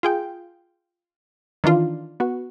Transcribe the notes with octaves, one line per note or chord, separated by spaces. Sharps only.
F4 G#4 G5
D#3 E3 D4 F4
B3 F#4